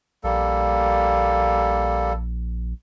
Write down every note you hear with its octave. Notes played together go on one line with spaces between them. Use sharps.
A#1 G3 A#3 A4